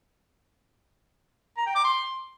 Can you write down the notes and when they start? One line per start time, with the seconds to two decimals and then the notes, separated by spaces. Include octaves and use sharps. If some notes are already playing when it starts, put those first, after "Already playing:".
1.58 A#5
1.67 G5
1.75 D6
1.84 C6